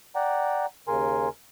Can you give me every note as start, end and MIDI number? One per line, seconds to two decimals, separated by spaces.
0.15 0.66 74
0.15 0.66 78
0.15 0.66 79
0.15 0.66 82
0.88 1.29 39
0.88 1.29 49
0.88 1.29 70
0.88 1.29 80
0.88 1.29 84